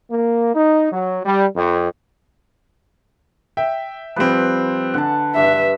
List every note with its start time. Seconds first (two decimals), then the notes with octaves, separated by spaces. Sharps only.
0.11 A#3
0.55 D#4
0.92 F#3
1.25 G3
1.56 F2
3.57 E5 G5
4.16 F3 G3 C4 B4
4.94 D3 F#5 A5
5.36 G2 E5